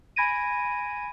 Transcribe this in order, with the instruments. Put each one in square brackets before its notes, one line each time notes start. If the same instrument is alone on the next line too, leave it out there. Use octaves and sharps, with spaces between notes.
[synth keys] G#5 B5 G#6 A#6 D7 D#7